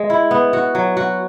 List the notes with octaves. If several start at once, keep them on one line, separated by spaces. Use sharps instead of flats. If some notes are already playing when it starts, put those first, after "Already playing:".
Already playing: G#3
E4
B3
F#4
F#3
F#4